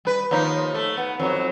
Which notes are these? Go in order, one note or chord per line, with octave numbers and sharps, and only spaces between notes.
G3 B4
D#2 F3 D#4
A3
B3
F2 F#3